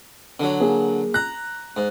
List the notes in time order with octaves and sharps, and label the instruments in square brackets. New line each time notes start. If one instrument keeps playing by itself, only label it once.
[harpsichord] D3 F#3
[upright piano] A#3 G#4
[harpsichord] A#5 [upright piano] F#6
[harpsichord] G#2